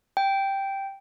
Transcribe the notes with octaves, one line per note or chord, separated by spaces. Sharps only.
G5